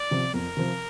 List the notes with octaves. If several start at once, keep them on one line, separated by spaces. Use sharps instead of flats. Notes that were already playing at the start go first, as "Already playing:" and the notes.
Already playing: D5
C3 F3
F2 A#4
C3 F3